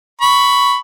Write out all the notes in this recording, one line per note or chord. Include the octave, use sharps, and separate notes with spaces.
B5 C#6